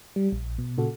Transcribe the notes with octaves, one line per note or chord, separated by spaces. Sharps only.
G3
A#1
B2
A#2 C#3 F#4 A4